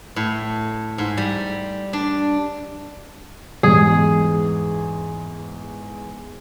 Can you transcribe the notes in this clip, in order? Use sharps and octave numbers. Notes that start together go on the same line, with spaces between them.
A2
G#2
G3
D4
E2 G#2 G#4